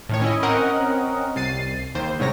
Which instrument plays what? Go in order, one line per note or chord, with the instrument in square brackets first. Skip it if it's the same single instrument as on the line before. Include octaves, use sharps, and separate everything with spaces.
[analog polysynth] A2 D#3 C#5
C#4 E4 D#5
C4 C#4 A#4 D#5 F#5
C2 A6 C7 D#7
D#2 C5
C2 G#2 C3 C#5 A#6